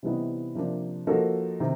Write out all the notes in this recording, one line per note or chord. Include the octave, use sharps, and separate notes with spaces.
C3 E3 G3 B3 D#4
C3 F3 A#3 D4
F3 A#3 D#4 F#4 A4
C3 D#3